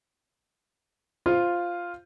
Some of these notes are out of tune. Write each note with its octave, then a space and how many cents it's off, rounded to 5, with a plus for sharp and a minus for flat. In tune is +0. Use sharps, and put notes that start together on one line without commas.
F4 +0 C5 +0 F5 +0